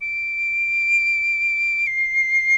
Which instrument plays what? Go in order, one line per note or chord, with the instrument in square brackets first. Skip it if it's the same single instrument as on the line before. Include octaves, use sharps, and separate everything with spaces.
[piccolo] D7
C7